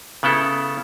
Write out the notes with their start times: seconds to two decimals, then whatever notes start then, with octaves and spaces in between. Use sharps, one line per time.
0.23 C#3 B3 E4 A4